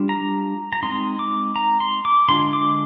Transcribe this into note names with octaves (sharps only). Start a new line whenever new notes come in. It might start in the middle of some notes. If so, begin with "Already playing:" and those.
Already playing: G3 D4 F4
A#5
A#5
G#3 C4 D#4 C6
D6
A#5
C6
D6
D3 G#3 D4 F4 C6
D6